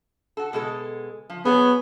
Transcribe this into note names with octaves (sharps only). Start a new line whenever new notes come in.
F#4 A4
B2 G#3 A4
F3
F#3 B3 G#4 C#5